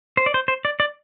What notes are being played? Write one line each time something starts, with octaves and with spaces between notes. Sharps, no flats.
C5
D5
C5
C5
D5
D5